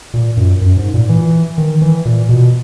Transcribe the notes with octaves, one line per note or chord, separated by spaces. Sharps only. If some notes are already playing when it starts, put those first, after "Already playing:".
A#2
F#2
F#2
G#2
A#2
E3
D#3
E3
A#2
B2